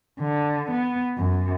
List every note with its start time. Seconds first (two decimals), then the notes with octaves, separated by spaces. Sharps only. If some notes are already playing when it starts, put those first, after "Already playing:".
0.20 D3
0.71 B3
1.18 F#2